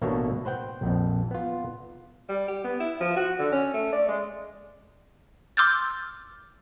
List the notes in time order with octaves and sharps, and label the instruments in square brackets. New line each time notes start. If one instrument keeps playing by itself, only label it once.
[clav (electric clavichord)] A1 B2 A#3 D4 C#5 E5
B4 C5 F#5 G5
A#1 F2
B3 F4
[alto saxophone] G3
G4
B3
E4
F3
F#4
D3
C#4
A3
D5
G#3
[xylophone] C6 D6 E6 F6 G6 A6